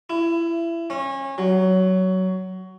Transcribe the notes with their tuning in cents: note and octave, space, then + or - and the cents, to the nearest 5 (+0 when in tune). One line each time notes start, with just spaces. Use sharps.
E4 +25
C#4 -30
F#3 +15